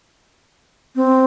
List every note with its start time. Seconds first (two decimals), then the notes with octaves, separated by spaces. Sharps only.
0.96 C4